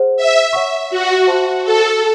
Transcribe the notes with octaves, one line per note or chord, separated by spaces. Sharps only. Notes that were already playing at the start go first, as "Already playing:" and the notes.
Already playing: G#4 C5 F#5
E5
C#5 F#5 C#6
F#4
C5 E5 A5 C6
A4